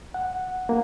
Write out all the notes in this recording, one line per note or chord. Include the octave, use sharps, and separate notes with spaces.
F#5
A#3